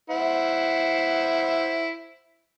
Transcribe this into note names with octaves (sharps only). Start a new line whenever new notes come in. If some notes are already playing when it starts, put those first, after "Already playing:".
E4 C5 F#5